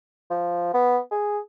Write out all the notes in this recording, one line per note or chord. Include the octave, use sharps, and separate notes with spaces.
F3
B3
G#4